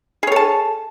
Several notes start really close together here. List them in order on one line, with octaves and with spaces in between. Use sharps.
G#4 C#5 A4 A5